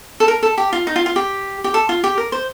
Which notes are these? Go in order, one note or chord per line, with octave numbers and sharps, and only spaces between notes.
A4
A#4
A4
G4
F4
D#4
F4
F4
G4
G4
A4
F4
G4
A#4
C5